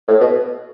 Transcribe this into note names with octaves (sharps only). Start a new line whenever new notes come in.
A2
B2